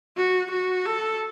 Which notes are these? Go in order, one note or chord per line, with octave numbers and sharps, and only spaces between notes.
F#4
F#4
A4